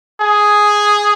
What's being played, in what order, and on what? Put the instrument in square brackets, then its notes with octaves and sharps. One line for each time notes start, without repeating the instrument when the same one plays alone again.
[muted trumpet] G#4